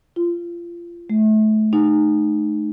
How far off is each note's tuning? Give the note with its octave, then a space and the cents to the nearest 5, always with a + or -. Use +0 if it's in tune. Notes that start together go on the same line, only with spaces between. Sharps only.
F4 -25
A3 -30
D#4 -25